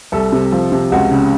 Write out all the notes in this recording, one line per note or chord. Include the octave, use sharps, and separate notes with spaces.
C2 A4
C3
F3
C3
C#2 F#4
C#3